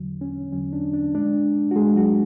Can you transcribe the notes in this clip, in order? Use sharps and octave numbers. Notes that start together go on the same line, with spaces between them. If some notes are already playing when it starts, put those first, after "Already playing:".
Already playing: E2 D3 F#3
C#4
E2 D3 F#3 C#4
D4
D4
A2 G#3 D4
F#4
A2 G#3 G#4
F#3 F#4